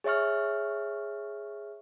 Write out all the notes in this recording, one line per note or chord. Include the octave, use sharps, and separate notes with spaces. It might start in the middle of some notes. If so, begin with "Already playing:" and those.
G#4 C#5 E5 C#6 F6